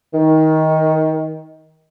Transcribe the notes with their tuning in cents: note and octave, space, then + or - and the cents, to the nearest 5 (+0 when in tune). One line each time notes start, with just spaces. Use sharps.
D#3 +20